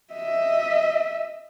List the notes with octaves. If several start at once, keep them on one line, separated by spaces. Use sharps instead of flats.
D#5 E5